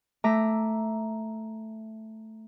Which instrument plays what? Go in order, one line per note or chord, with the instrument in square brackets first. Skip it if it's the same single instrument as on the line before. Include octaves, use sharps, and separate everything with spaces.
[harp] A3 E5 A#5 D6